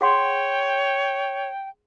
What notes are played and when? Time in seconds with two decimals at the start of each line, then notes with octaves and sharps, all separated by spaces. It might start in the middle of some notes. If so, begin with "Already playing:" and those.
0.01 G#4 C#5 F#5 G5 C6